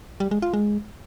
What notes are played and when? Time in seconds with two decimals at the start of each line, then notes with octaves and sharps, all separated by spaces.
0.20 G3
0.31 G#3
0.42 F4
0.53 G#3